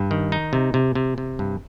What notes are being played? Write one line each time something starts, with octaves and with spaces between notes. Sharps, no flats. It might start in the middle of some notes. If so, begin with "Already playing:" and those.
Already playing: G2
D#3
D#4
C3
C3
C3
C3
G2